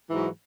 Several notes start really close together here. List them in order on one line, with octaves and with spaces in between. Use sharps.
E3 G#2 F#3